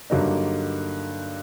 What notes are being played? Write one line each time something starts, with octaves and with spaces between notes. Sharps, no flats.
G2 D3 F#3 A#3 D#4